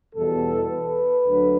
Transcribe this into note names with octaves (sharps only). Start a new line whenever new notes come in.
E2 B2 G3 B3 A4
B4
D2 D3 F#3